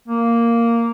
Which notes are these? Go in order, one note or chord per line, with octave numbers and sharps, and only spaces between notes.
A#3